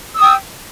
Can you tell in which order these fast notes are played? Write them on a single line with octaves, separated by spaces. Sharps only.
E6 D#6 G5